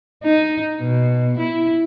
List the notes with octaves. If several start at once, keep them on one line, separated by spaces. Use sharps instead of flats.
D#4
B2
E4